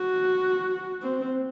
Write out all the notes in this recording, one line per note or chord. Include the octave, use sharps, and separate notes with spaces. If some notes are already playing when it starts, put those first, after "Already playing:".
Already playing: F#4
C4